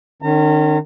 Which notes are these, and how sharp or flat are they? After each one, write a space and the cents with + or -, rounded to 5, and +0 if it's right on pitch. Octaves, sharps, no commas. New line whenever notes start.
D#3 -35 C#4 +0 A#5 -40